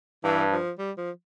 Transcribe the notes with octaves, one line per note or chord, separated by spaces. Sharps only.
G2 E3
F3
G3
F3